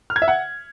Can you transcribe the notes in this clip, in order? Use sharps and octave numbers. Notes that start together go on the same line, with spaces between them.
F6
G#6
E5
F#5